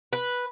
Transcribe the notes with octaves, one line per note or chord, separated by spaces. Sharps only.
B4